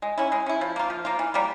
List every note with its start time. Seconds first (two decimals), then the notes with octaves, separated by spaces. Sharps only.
0.02 G#3
0.18 C#4 E4
0.32 G#3
0.46 C#4 E4
0.61 F3
0.76 A#3 F4
0.90 F3
1.05 A#3 F4
1.19 E3
1.34 G3 A#3